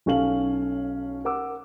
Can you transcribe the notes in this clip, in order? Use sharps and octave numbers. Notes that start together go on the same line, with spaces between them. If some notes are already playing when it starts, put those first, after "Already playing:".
B1 C#4 A4 F5 F#7
A#4 F#5 D6 E6